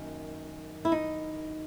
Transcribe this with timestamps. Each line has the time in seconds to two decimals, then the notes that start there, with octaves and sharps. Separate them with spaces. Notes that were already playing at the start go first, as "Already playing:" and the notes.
Already playing: F#2 D#3 A#3
0.85 E4
0.92 D#4